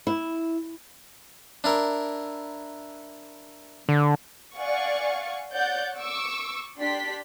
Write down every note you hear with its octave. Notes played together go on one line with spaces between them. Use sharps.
E4
D4 E4 A#4
D3
D5 F5 F#5 G#5 C#6
C#5 D5 F#5 G6 A6
C#6 D6 E6
D4 G4 D5 C6 B6